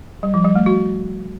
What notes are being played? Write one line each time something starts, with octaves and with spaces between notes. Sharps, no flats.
G3
F3
G3
A3
F#4